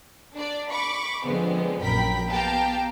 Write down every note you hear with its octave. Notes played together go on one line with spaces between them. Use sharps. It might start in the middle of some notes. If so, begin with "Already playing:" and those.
D4 D5
B5 C#6 D6
D3 F3 G#3 B3 C4
A#1 F#2 A#4 G5 B5 B6
B3 G4 F5 G5 A5 A#5